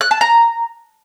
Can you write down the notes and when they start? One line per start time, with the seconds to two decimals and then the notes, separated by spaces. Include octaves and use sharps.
0.01 F#6
0.11 A5
0.21 A#5